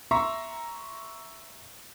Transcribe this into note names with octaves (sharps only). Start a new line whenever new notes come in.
E5 A#5 C6 C#6